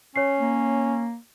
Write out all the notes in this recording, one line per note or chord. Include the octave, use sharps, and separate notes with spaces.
C#4 C#5 C7
A#3